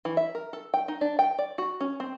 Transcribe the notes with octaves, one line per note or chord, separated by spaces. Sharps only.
E3
E5
A#4
A4
G5
D#4
D4
G5
D5
F#4
C#4
C4